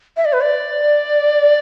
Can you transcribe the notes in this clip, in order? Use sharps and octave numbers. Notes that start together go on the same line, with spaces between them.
E5
D5
B4
D5